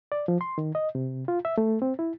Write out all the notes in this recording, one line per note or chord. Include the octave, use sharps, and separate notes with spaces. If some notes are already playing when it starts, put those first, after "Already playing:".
D5
F3
C6
D#3
D#5
C3
F4
E5
A3
C4
E4